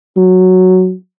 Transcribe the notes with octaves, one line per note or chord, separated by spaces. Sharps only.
F#3